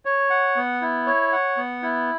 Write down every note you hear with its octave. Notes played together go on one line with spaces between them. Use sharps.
C#5
F#5
B3
E4
C#5
F#5
B3
E4